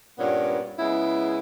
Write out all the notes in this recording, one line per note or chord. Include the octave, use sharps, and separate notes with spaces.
G2 A#2 B3 C#4
C#3 G#3 B3 E4